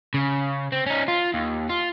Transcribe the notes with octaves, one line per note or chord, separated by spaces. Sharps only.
C#3
C4
C#4 D#4
F4
D#2
F4